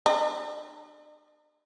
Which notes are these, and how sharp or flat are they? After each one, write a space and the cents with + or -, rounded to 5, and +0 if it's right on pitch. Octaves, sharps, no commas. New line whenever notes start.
D4 +40